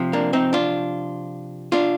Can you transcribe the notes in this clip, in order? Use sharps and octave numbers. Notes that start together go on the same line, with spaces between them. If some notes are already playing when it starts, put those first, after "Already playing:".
Already playing: C3 F3
A#3 D4
C4 D#4
D4 F4
D4 F4